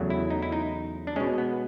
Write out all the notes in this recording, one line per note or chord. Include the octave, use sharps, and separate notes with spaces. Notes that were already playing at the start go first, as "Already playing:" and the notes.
Already playing: E2 C#3 F#3 A3
E4
D#4
E4
D#4
D4
B2 G#3 C#4
B3